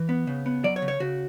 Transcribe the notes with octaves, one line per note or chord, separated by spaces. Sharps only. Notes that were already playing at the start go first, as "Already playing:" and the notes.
Already playing: E3
B3
C#3
B3
F#3 D5
C#5
C#3
C#5
C#3 F#4